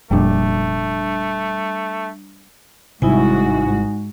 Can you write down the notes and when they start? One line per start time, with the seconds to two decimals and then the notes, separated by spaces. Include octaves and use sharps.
0.11 F1 F2 A#2 G3 A3 D4
3.02 G#1 G#2 C3 G3 D#4 E4 F#4 G#5